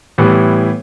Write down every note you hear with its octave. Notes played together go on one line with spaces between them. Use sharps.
A2 E3 G3 B3